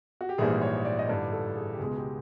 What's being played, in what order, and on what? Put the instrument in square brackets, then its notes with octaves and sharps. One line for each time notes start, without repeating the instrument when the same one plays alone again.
[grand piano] F#4
G4
A#1 G#2 E3 G3 A#3 G#4
C#5
D5
D#5
A1 G2 D3 D5
A4
G#4
G4
C#2 B2 G#3 G#4
G4